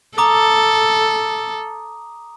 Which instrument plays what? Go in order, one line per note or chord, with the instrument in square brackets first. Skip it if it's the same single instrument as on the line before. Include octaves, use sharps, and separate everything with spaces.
[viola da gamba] A4 [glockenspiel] A#5 D6 D#6